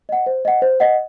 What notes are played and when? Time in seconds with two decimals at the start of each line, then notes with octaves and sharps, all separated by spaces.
0.09 D#5 F#5
0.26 C5
0.45 D#5 F#5
0.62 C5
0.80 D#5 F#5